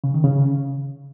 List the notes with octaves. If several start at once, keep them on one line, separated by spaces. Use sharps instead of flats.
C#3
D#3
C#3